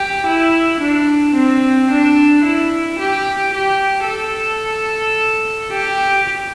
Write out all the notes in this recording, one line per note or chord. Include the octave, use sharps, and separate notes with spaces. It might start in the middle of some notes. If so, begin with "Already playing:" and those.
Already playing: G4
E4
D4
C4
D4
E4
G4
G4
A4
G4